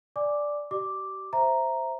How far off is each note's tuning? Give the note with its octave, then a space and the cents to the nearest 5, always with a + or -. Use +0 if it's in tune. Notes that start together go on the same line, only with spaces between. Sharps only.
D5 +0 G#5 +0 D6 +0
G4 -35 D5 +35 D6 +0
C5 +0 E5 +0 A#5 +0